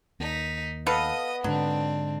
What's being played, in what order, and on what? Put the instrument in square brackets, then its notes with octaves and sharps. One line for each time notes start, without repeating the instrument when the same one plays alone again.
[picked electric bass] D#2 [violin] D#4 B6
[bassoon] B3 [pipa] A4 B4 F5 [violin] D#5 D#6
[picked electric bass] G#2 D3 [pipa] F#3 [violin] C4 D4